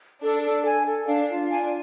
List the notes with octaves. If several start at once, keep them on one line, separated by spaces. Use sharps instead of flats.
D4 A4
A4
G#5
A4
D4 F5
F4
D4 G#5